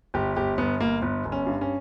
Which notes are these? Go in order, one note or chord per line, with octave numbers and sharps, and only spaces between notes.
G1 G4
G1 G4
G1 B3
G1 A#3
G1 B3
G1
C#4
G2
C#4